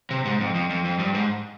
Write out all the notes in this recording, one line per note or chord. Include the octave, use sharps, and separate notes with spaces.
C3
G#2
F2
F2
F2
F2
G2
G#2